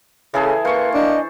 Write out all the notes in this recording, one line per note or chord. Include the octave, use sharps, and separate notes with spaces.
C#3 E3 G#4 A4
A#3 B4 C5 C#6
D4 D#5